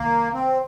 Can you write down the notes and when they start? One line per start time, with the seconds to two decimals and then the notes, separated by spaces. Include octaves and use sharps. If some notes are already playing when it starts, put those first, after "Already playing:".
Already playing: C2 D#3 A#3
0.33 C4